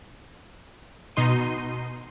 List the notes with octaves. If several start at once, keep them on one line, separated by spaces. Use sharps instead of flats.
B2 D#4 C6 D#7